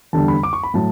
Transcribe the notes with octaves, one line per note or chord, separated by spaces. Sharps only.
E2 D3 G3 A5
B5
D6
C#6
B5
A2 F#3 A5